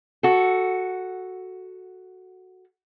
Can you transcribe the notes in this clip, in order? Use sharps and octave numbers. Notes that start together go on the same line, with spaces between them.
F#4 A4